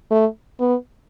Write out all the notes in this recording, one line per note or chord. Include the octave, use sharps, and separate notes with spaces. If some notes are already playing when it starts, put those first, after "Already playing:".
A3
B3